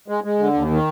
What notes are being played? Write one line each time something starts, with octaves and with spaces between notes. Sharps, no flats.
G#3
G#3
D3
D#2
D#3